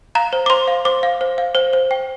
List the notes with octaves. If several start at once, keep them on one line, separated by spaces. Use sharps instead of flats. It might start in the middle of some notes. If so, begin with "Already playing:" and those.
F5 A#5
C5
D6
C5 C6
F5
C5 D6
F5
C5
F5
C5
C5
G5